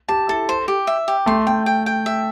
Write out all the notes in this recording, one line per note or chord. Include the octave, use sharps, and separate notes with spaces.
G4 A5
E4 A4
C5
G4
E5
G4
A3 C6
A3 G5
G5
G5
E5